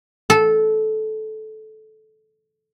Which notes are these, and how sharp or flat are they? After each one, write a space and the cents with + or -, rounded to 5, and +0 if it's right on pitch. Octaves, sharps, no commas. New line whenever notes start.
A4 -15